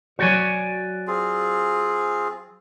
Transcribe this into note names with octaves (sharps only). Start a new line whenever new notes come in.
F#3 F#4 C#5 D5 G#5
C4 F4 G#4